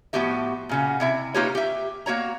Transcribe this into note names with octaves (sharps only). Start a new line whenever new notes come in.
A2 F3 B3 F#4 G4 E5
A#2 C#3 F#4
C3 E4 E5
A#3 D#4 F4 G4 B4 C#5
G4 E5
A#3 F#4 C#5 A#5